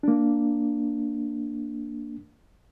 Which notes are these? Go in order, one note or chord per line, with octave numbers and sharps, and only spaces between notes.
A#3 D4